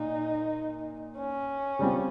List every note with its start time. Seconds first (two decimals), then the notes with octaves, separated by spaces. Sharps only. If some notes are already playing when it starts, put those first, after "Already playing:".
Already playing: A#2 D#4
1.18 C#4
1.79 C#3 G3 C4 F4